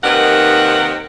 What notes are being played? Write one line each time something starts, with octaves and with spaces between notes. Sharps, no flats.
D#2 C3 D#3 A#4 B4 F#5